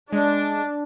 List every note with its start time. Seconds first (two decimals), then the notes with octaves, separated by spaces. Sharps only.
0.12 G#3 D4